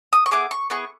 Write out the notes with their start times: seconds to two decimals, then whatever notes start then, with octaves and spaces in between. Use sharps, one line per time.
0.13 D#6
0.26 C#6
0.31 B3 E4 G#4 D6
0.51 C#6
0.70 B3 E4 G#4 C#6